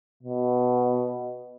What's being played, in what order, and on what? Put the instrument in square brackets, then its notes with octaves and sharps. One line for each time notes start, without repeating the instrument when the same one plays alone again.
[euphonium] B2